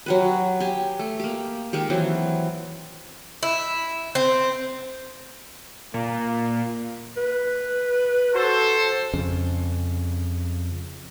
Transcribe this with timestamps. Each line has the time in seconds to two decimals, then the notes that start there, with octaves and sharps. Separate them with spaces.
0.06 F#3 G4 B4
0.60 G4 G#5
0.99 A3
1.20 A#3 G4
1.73 D#3 G#3 G4
1.90 E3 F#3 C4
3.43 E4
4.15 C4
5.94 A#2 A#3
7.17 B4
8.34 F#4 A4 C5
9.14 F2 C#3